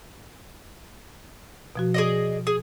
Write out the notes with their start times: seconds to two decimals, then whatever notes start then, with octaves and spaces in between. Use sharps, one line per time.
1.76 B2 F3 F#4
1.94 G#4 D5 D#5
2.47 G#4